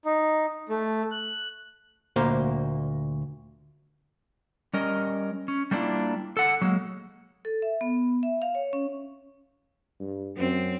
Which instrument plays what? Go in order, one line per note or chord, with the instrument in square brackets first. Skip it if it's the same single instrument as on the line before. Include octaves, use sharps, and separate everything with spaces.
[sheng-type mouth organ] D#4
A3
F#6
[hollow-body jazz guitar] D2 A#2 A#3 C5 F5
[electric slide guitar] G3 C#4 A#4 D#5
C#4
G3 A3 A#3 D4 E4 F4
A4 F#5
F#3 G#3 A#3
[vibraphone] A4
E5
B3
E5
F5
C#5
C#4
[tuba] G2
[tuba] F#2 [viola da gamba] C4